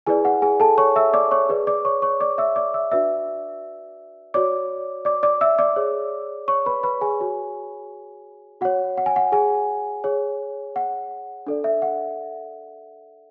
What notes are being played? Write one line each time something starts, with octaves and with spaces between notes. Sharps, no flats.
E4 G#4 B4 D5 G#5
F#5
G#4 G#5
A4 A5
C#5 C#6
E5 E6
D5 D6
C#5 C#6
G#4 B4 D5
D5 D6
C#5 C#6
C#5 C#6
D5 D6
E5 E6
D5 D6
E5 E6
D4 F#4 B4 D5 E5 E6
F#4 C#5 D5 D6
D5 D6
D5 D6
E5 E6
D5 D6
G#4 C#5
C#5 C#6
B4 B5
B4 B5
G#4 G#5
F#4 C#5
F#4 C#5 F#5
F#5
G#5
F#5
G#4 G#5
G#4 C#5
F#5
D4 A4 D5
E5
F#5